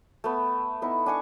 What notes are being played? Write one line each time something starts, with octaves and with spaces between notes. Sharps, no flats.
A3 B3
B3 D#4 E4
D4 G#5 C#6